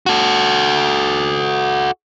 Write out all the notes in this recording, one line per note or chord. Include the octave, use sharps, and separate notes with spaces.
F#4 A4